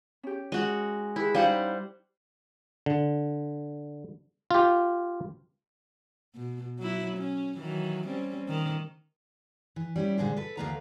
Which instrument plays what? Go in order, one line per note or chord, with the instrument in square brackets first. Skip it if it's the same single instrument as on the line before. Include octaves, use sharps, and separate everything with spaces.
[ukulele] C#4 G4
[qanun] G#3 F#4
[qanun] E4 [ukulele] G4 G#4 B4
[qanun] G3 C5 F#5 [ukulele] C#4 D#4 F5
[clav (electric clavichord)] D3
F4 G4
[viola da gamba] B2
F#3 E4
C#4
D#3 E3 F#3
G3 C4 C#4
D#3
[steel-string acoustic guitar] E3
G3 C#4 E4
A#2 D3 G#3 D4 C5
A4 B4
D2 F#3 A#3 B4 F5 A#5